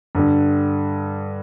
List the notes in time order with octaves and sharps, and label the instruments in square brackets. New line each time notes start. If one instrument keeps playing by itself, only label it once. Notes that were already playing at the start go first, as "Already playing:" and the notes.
[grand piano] G2 D3 G3